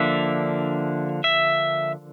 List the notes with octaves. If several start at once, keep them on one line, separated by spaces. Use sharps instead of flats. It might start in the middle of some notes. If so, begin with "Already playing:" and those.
Already playing: D3 F3 A#3 D4 E5
E5